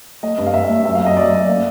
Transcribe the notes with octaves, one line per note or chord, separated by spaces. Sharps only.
A3 D#5
G2
F5
G2 E5
E5
A3
F#2 E5
F5
F#2
D#5
F#2 D5
F#2
A#3